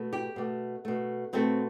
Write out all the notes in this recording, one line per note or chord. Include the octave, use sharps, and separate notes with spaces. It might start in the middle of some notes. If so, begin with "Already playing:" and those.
Already playing: B2 A3
G4
B2 A3
B2 A3
B2 A3 C4